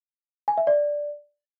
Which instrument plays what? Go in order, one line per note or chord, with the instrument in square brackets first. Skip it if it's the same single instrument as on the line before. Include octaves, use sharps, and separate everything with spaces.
[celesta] G#5
E5
D5